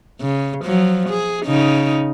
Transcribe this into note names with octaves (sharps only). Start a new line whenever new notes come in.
C#3
F3 F#3
G#4
C#3 D#4